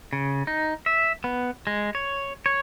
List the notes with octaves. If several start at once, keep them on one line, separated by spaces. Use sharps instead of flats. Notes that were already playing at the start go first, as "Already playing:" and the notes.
C#3
D#4
E5
B3
G#3
C#5
C#5